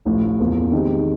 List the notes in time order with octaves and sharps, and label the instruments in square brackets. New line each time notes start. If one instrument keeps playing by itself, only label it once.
[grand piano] A1 A2 F3
E2 C#3 F3 A#3
D#3 G#3 C4 D#4 G4